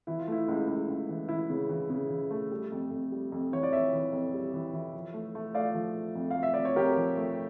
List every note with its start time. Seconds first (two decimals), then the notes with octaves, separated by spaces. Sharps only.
0.07 E3 E4
0.19 F4
0.28 A3 E4
0.48 C#2
0.68 C#2
0.89 C#2
1.09 E3
1.29 E3 E4
1.49 C#3
1.69 E3
1.90 C#3
2.10 E3
2.31 A3
2.51 G3
2.72 F2
2.91 F2
3.12 G3
3.32 F2
3.52 E3 C#5
3.63 D5
3.72 F2 C#5 E5
3.93 E3
4.12 F2
4.34 G3
4.54 E3
4.73 E3
4.94 F3
5.14 A3
5.35 A3
5.55 A3 D5 F5
5.75 F3
5.95 F3
6.15 F2
6.31 F5
6.36 A3
6.43 E5
6.54 F2 D5
6.65 C#5
6.76 F2 G4 A#4
6.97 F3
7.17 A3